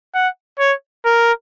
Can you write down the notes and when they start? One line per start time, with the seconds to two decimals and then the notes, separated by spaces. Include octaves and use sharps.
0.14 F#5
0.59 C#5
1.05 A#4